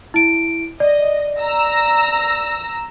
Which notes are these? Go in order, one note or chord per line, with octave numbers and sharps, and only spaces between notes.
E4 D7
D5 D#5
A#5 E6 A#6